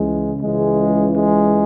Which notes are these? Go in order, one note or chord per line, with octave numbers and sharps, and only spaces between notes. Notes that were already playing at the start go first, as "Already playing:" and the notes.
Already playing: C#2 C#3 E3 G#3
C#2 C#3 E3 G#3
G#3